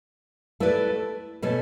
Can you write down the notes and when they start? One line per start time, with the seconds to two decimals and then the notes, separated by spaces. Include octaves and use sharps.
0.60 A3 E4 B4 D5
1.42 B2 A3 C#4